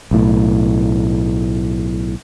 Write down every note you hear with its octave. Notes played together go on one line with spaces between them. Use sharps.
B1 A2